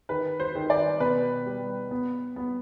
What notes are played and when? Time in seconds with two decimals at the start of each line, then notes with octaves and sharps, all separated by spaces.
0.09 D#3 B4
0.40 C5
0.55 D#3
0.70 D5
1.00 B2 B4
1.46 G3
1.91 B3
2.36 B3